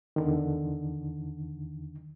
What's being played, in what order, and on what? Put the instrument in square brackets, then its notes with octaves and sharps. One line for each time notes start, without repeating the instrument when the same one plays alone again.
[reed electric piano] E2 D3 D#3